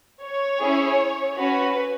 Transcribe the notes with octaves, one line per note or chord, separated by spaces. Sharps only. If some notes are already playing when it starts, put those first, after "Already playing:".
C#5
C#4 E4 G#4
C#4 F#4 B4